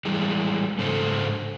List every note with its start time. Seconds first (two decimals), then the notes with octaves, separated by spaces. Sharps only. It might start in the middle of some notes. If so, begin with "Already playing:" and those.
0.05 E3 G3 G#3
0.78 G#2 C#3 D4 A4 C5